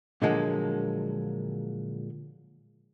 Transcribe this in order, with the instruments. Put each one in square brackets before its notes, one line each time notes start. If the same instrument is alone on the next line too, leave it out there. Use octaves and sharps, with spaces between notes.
[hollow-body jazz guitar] A#2 D3 F3 F#3 G#3 A#3